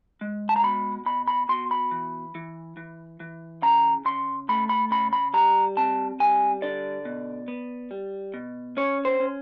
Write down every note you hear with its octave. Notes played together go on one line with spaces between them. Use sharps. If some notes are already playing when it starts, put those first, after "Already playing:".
G#3
A5
A#5
B2 B5
B2 B5
B5
B2 C6
B5
E3
E3
E3
E3
C#3 A#5
C#3 C6
A3 B5
B5
C#3 B5
B5
G3 A#5
C4 A5
G3 G#5
D3 D5
B2
B3
G3
B2
C#4 C#5
C5
C#4